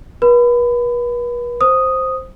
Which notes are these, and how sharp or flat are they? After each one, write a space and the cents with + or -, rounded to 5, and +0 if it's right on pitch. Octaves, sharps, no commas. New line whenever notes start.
B4 -40 B5 +25
C5 +0 D#6 +0